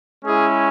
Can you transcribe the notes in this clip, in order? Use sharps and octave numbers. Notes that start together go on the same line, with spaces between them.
G#3 C#4 E4 G#4